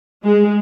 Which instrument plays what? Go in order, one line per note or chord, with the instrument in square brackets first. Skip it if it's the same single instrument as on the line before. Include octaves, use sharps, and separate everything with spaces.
[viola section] G#3